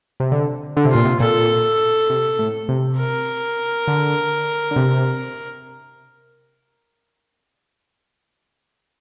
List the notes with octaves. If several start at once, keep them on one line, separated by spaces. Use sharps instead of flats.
C3
D3
D3
C3
A#2 F4
C3
A#2 A4
C3
A2
C3
A#4
D3
D3
C3